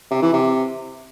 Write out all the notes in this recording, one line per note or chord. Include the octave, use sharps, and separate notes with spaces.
C3
E3
C3